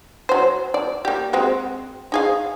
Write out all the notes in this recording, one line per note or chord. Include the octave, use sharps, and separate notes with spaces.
F#3 C5
D5
A#3 G4
G#3 C4 F#4
D#4 G#4 F5